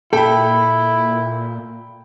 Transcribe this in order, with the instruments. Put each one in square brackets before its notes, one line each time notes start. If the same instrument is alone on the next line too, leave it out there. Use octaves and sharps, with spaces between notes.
[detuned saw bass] A#2 [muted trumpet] E4 [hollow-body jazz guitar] A4 [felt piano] G5 B5